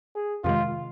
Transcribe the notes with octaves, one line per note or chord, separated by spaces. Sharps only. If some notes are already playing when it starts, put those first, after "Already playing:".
G#4
F2 C3 D#3 G#3 F4